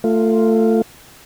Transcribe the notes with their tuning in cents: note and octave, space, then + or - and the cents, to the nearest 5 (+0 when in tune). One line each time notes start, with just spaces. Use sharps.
A3 +20 F4 +0